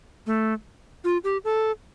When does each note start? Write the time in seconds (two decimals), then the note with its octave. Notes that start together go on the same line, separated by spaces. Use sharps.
0.26 A3
1.04 F4
1.24 G4
1.44 A4